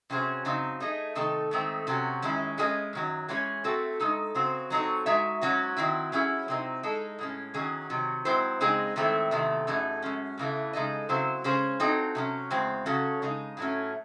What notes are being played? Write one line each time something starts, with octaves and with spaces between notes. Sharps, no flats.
C3 F#3 C#4 G#4 C5
F#2 C#3 F#3 C4 D#4
A3 D#4 G#4 D#5
C3 D#3 A3 D#4 A4
G#2 D#3 A3 C4
C3 F#3 C#4 F#4
F#2 D#3 G#3 C#4 E4
G#3 C#4 G#4 D#5
F#2 D#3 F#3
E3 G#3 C#4 G#4 C#5
A3 C4 F#4 A4
G#3 D#4 A4
C#3 F#3 C4 F#4 C5
F#3 C4 D#4 A4 C#5
G#3 D#4 F#4 C#5 E5
G#2 F#3 C#4 F#4
D#3 F#3 C4 E4
F#3 C#4 E4 G#4
C3 F#3 C4 D#4
G#3 D#4 A4
A2 G#3 C#4
E2 D#3 F#3 C#4 G#4
C3 D#3 F#3
G#2 F#3 C4 E4 C5
C#3 G#3 C4 D#4 G#4
G#2 D#3 A3 C4 E4
E2 C3 D#3 A3
F#2 E3 A3 D#4 G#4
F#2 C#3 G#3 C#4
E2 C#3 E3 A3
C#3 G#3 D#4 A4 D#5
C#3 F#3 C4 E4 C5
C#3 G#3 C#4 G#4 C5
F#3 C4 D#4 A4
C3 F#3 C#4
E2 C#3 G#3 C4
C#3 F#3 C#4 F#4 A4
C#3 G#3 D#4
A2 F#3 A3 C#4